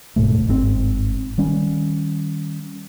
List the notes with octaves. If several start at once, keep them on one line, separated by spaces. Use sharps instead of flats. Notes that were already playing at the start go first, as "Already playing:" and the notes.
D#1 G#2 B2 A3
G1 G#2 C#3 C4
D#3 G3 C#4